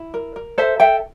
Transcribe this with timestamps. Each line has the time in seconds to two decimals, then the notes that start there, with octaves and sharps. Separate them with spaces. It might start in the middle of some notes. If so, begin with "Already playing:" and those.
Already playing: E4
0.14 A#4
0.36 A#4
0.58 A4 C5 E5
0.80 A4 E5 G5